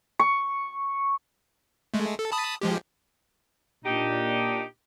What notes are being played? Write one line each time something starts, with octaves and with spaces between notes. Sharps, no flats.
C#6
G#3 A3
A4
A5 B5 D#6
F3 G#3 G4
A#2 D4 D#4 G4